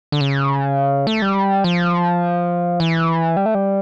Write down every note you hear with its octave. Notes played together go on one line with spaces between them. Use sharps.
D3
C#3
A3
G3
F3
E3
G3
A3
G3